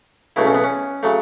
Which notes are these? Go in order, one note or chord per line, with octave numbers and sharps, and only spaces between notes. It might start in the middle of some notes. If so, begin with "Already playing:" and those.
C#2 B2 F#3 A3 E4
C#4
B3
C#4
C#3 F#3 A3